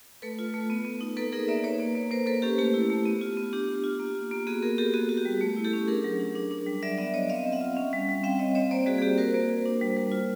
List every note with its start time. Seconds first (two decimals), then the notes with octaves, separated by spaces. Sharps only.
0.22 A3 A4 B4
0.39 F4
0.54 A3
0.70 B3
0.85 B3
1.01 D#4
1.17 A#3 A4 B4
1.32 D#4 G#4 A#4
1.48 A#3 D5 E5
1.64 A#3 B4 C#5
1.80 A#3
1.95 A#3
2.11 A#3 A#4 C5
2.26 A#3 A4 B4
2.42 C#4 G4 A4
2.58 A3 G4
2.74 E4
2.90 A3
3.06 B3
3.21 F4
3.37 B3
3.53 D4 G4
3.69 F4
3.84 F4
4.00 A#3
4.15 F4
4.31 A#3
4.47 B3 F#4 G#4
4.62 B3 G#4 A#4
4.78 B3 G4 A4
4.94 B3 F#4 G#4
5.09 F#4
5.17 G4
5.25 G3
5.41 A3
5.56 E4
5.64 G4 A4
5.73 C#4
5.88 D4 G#4 A#4
6.04 F#3
6.20 D4
6.35 D4
6.51 D4
6.67 G3
6.83 F#3 D5 E5
6.98 B3 D5 E5
7.14 B3 C#5 D#5
7.30 C4 D#5 F5
7.46 C4
7.53 E5 F#5
7.61 F4
7.77 C#4
7.93 G3
8.09 G3
8.24 C4 F5 G5
8.39 C4 C#5 D#5
8.55 C4 C#5 D#5
8.71 A#3 C5 D5
8.86 G3 F#4 G#4
8.98 G#4
9.02 A#3 G4
9.18 F#4 A#4 C5
9.34 A#3
9.49 F#4
9.66 D4
9.81 G3
9.97 G3
10.12 F4